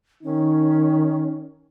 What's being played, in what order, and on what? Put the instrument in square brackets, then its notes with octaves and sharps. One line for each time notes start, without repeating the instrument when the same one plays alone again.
[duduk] D#3 [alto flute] C#4 [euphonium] D#4